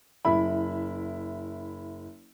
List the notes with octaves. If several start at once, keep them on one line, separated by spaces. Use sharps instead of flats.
F#1 E4 B5